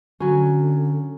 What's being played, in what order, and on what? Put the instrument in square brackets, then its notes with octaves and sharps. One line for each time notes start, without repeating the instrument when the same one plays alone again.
[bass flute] D3 [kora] F#3 C#4